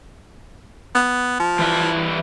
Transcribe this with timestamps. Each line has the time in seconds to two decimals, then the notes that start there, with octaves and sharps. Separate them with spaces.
0.95 B3
1.40 F3
1.59 E3 G3 E5